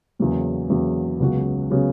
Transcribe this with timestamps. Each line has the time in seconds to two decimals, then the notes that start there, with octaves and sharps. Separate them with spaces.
0.19 E2 C#3 F#3 A#3
0.69 E2 C#3 F#3 A#3
1.20 C#2 C#3 F#3 B3 F#4
1.70 C#3 F#3 B3 F#4